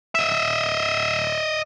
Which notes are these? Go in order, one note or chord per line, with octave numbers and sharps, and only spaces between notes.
D#5 E5